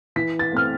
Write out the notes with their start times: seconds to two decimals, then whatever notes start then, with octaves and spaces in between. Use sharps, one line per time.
0.16 E3 B6
0.39 A6
0.52 A3 C4 F6